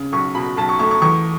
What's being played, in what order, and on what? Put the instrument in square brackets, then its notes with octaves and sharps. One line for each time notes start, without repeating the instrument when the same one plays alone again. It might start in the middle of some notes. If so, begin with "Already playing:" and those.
Already playing: [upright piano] C#3
B1 C#6
B2 B5
B1 A5
C#6
A3 C#6
C#6
E2 C#6